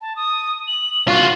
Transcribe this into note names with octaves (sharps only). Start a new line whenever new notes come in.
A5
D#6
F#7
F4 F#4